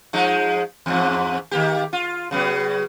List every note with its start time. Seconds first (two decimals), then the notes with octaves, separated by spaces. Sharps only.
0.13 F3 G#3 D#4
0.86 E2 G#2 F3
1.51 D#3 A#3 G4
1.93 F4
2.31 C#3 F#3 B3